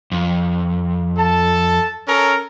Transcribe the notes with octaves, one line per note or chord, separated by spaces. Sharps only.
F2
A4 A5
C#4 A4 A#4